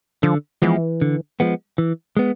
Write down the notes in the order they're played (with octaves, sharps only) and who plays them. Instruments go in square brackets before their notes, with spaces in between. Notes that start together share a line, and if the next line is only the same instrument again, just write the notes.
[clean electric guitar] D3 [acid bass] F3
[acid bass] E3 [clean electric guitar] F3 G#3 B3
[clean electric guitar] D3
F3 G#3 B3
E3
G#3 B3